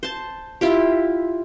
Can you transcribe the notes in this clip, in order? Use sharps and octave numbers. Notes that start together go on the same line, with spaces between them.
C5 A5
E4 F4 G4